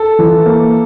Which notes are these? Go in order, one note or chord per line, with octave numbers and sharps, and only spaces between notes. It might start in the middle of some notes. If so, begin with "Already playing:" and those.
Already playing: A4
E3
A#3